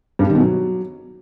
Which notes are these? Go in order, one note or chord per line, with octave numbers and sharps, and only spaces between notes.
G2
G3
D#3
B2
F#3